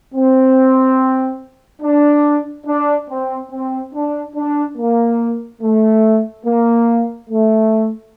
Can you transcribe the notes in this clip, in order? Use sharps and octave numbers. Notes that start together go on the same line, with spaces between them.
C4
D4
D4
C4
C4
D4
D4
A#3
A3
A#3
A3